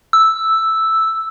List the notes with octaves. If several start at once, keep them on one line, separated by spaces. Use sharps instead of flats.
E6